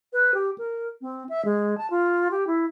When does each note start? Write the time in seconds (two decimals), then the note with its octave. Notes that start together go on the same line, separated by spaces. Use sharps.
0.13 B4
0.34 G4
0.58 A#4
1.01 C4
1.29 E5
1.45 G#3
1.78 A5
1.90 F4
2.31 G4
2.47 E4